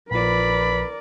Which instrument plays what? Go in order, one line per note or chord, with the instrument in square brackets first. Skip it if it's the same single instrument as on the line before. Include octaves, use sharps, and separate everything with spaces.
[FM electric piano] A#1 F3 [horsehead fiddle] A#4 D5 [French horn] B4 [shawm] B5